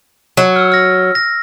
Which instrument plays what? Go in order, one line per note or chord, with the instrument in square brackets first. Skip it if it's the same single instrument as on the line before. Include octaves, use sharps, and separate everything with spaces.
[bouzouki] F#3
[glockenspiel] E6 F6
F6 A#6
A#6